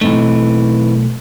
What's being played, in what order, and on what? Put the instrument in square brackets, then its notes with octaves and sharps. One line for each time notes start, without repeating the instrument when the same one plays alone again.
[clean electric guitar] B1 G#2 A3 [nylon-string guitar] E3 C4 D#4